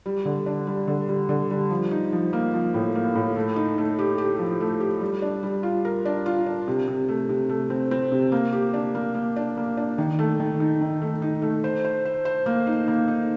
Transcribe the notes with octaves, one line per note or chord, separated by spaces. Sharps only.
G3
D3
D4
G3
D3
G3
D3
G3
F3
D#4
F3
A#3
F3
A2
A#3
A2
A3
D#4
A3
G4
G4
F3
A3
G4
G3
D4
G3
F4
A#4
D4
F4
D4
C3
C3
A3
C3
A3
C4
C4
C3
A#3
G4
D4
A#3
A#3
D4
A#3
D4
D#3
A3
D#3
D#4
D#3
A3
D#4
A3
C5
C5
C5
C5
A#3
D#4
A#3
D#4